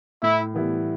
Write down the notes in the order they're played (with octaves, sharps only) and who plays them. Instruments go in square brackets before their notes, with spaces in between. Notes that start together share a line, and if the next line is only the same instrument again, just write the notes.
[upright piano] A2 [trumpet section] E4
[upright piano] E3 G3 B3 E4